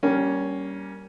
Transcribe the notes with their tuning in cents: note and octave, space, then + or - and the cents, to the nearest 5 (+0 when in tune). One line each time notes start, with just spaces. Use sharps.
G3 -20 A#3 +0 C#4 +5